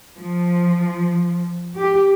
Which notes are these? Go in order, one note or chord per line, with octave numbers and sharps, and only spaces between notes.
F3
G4